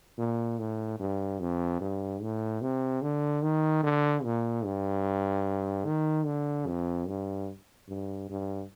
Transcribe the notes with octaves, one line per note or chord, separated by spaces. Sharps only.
A#2
A2
G2
F2
G2
A2
C3
D3
D#3
D3
A#2
G2
D#3
D3
F2
G2
G2
G2